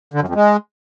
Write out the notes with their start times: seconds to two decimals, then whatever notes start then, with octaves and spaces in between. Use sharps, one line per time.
0.14 D3
0.21 F#2
0.28 F2
0.35 G#3